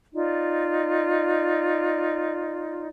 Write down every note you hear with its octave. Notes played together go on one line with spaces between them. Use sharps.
D#4 F4 D5